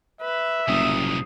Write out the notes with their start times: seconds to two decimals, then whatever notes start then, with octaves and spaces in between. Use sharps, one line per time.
0.21 B4 E5
0.68 F#1 C2 A#2 D#6